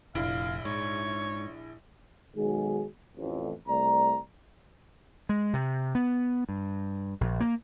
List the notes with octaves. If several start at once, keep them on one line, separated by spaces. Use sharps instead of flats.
F1 A#1 E4 F5 D7
G#2 C#5
B1 D#3 G#3 F#4 G#4
A1 F2
C2 A3 D5 A#5
G#3
C3
B3
G2
A#1
A#3